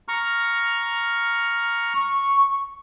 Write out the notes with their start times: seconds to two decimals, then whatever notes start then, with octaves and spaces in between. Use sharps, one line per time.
0.08 A#5 C#6 F6
1.95 C#6